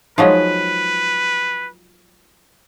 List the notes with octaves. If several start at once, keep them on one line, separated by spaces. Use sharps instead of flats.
F3 F#3 G#3 D#4 B4 C#5 D#5